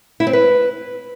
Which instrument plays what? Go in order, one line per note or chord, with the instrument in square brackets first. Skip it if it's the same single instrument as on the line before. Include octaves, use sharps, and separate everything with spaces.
[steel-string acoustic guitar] E4
C4
B4